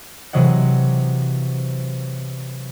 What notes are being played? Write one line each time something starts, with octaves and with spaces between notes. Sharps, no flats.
C3 E3 F#3 D#5 F#5